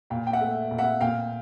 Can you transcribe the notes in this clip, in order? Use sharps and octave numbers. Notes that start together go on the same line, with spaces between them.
A#2 F5 G5
G5
E5 F#5
A3
A#2
E5 F#5
A#2 F5 G5